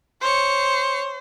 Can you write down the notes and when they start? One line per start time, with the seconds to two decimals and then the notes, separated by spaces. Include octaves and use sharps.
0.21 C5 C#5 C#7